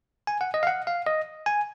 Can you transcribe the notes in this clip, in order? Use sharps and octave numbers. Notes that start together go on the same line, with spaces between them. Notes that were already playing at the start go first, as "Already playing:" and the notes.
G#5
F#5
D#5
F5
F#5
F5
D#5
G#5